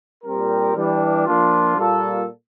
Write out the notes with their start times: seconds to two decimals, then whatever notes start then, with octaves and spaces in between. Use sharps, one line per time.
0.24 A#2 G3 C4 G4 A#4
0.75 E3 G3 D4
1.26 F3 A#3 D4 F4
1.76 A#2 G3 A#3 F4 A4